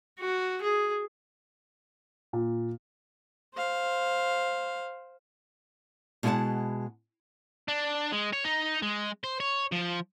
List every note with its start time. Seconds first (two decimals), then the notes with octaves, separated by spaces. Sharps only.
0.19 F#4
0.62 G#4
2.33 A#2
3.55 C5 F5
6.23 B2 G#3 E4 F#4 F#5 A5
7.68 D4
8.12 G#3
8.33 C#5
8.44 D#4
8.82 G#3
9.24 C5
9.40 C#5
9.72 F3